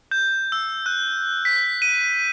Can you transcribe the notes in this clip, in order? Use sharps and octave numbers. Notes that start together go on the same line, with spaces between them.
G6
E6
F#6
B6
D#7